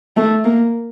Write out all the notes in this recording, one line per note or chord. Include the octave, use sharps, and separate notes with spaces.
A3
A#3